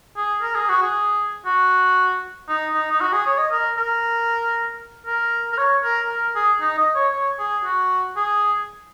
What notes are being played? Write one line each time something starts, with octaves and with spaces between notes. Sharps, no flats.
G#4
A#4
G#4
F#4
G#4
F#4
D#4
D#4
D#4
F#4
G#4
C#5
D#5
A#4
A#4
A#4
A#4
C#5
A#4
A#4
G#4
D#4
D#5
C#5
C#5
G#4
F#4
G#4